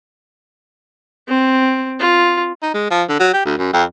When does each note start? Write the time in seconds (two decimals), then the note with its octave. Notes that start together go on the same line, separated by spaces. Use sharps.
1.28 C4
1.99 F4
2.63 D#4
2.74 G#3
2.91 F3
3.09 D3
3.20 F#3
3.33 G4
3.45 D2
3.58 F#2
3.73 F2